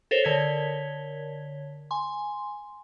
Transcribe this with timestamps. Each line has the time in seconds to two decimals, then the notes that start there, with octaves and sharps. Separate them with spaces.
0.11 A4 A#4 C5 C#5
0.23 D3 A#4 C#5 G#6 B6 G7
1.91 G#5 C6